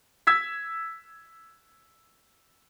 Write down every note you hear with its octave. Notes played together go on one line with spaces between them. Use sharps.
E6 G#6 B6